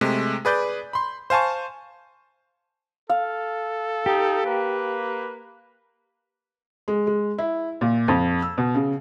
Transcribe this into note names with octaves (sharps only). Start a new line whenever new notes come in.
C3 G#3 A3
G#4 B4 D5 G6
B5 C6
C5 F5 G#5 A5 C#6
A4 F5
D#4 G4
A#3 B4
G#3
G#3
E4
A#2
F2
E6
B2
C#3